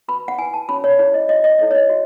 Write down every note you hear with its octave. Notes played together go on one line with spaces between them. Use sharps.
F#4 B4 B5
F#5
E4 B4 G#5
A5
C#4 F#4 C#5 B5
C#5
E4 G#4 C#5
D#5
F#4 C#5 D#5
D#5
E4 A4 C#5 D#5
C#5
D#5
F#4